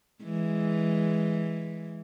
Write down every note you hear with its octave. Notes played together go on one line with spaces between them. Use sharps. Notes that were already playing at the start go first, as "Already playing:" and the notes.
E3 G#3